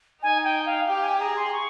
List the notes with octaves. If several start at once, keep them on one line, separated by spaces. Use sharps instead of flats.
D#4 G#5
G5
F5
G4 G5
G5
G#5
G#4 A#5
C6
C#6